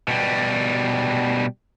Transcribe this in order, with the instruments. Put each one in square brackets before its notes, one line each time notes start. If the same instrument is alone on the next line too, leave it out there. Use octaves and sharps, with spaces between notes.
[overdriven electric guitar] B2 G3